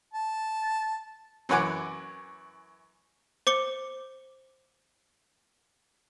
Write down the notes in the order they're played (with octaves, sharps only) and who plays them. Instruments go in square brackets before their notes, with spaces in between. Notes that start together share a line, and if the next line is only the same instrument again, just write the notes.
[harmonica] A5
[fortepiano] F#2 E3 C#5 F#5 G#5 D6
[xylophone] C5 D6 C#7 G7